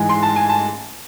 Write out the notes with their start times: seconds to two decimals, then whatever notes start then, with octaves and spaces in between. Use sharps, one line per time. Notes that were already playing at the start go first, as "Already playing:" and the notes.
Already playing: G#2 E3 G#3 G#5
0.09 C6
0.23 A5
0.36 G#5
0.49 A5